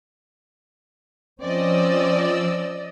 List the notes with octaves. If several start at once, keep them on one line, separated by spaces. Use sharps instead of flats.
F3 C4 C#4 D5 D#5 E6